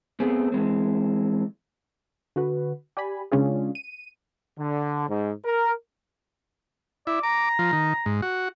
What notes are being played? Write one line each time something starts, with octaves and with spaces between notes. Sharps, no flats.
A3 B3 C4 G#4
E3 G#3 C4
D3 F#4 B4
G4 D5 G#5 B5
C#3 G#3 C#4 D4 F4 G#4
D#7
D3
G#2
A#4
E4 D5
A#5 D6
F3
D#3
G#2
F#4